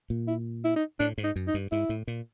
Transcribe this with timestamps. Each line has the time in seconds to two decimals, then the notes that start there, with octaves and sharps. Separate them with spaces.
0.10 A#2
0.28 E4
0.65 E4
0.76 D#4
1.00 A2 D4
1.18 G#2
1.24 D#4
1.36 F#2
1.48 D#4
1.54 G2
1.72 G#2 E4
1.89 A2
2.07 A#2